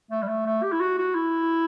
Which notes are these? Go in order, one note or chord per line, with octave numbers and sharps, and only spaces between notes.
A3
G3
A3
A3
G4
E4
F#4
F#4
E4